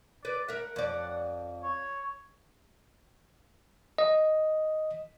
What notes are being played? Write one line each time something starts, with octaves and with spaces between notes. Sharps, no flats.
B4 D5
A#4 E5 F#5
F2 D5
C#5
D#5